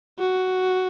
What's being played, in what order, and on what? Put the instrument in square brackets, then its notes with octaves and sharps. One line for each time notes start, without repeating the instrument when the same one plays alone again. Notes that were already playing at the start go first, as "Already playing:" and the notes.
[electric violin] F#4